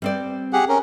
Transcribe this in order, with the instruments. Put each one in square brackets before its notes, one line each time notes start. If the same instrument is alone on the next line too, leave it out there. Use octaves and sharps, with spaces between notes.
[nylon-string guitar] G3 C4 D5
[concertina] G4 G#4 F#5
C#4 A#4